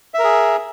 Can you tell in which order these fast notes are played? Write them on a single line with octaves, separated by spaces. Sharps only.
E5 A#4 G#4